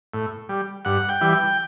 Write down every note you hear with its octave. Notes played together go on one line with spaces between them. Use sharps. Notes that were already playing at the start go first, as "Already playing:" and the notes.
A2
G3
G2 F#5
G5
E3 G3
G5